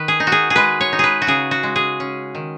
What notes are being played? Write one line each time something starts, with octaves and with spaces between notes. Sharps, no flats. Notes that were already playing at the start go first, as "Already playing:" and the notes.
Already playing: D#3 B4
G#4
D#4
F#4
G#4
G#4
G#3 B4
C#5
D#4
G#4 B4
F#4
C#3 G#4
F#4
G#3
G#4
C#4
D#3